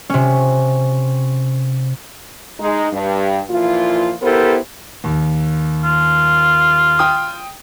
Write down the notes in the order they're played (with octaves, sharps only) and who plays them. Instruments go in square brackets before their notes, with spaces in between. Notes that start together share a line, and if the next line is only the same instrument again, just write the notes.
[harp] C3 C#4
[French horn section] G#3 D#4
G2
A#2 E3 F3 F4
B3 E4 G4 A4 A#4 C5
[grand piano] D#2
[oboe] F4
[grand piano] G5 D#6